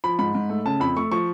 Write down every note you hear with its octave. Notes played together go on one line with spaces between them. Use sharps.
F3 B5
G#2 B5
G#2
A3
C#3 A5
F2 B5
A3 C#6
F3 C#6